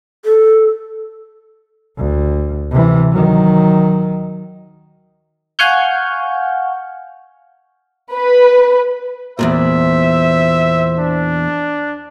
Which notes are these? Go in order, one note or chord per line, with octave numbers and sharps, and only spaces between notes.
A4
D2
C3 E3
D#3 F#3
F5 F#5 G#5 C#6 F6 G6
B4
E2 G2 A#2 C5 E5
D4